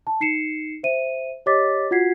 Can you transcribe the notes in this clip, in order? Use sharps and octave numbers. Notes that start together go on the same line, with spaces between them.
A5
D#4 C7 C#7 E7
C5 E5 D#7
G4 C#5 D#5 D6 A6 B6
F4 F#4 F#5 G#6 B6 C7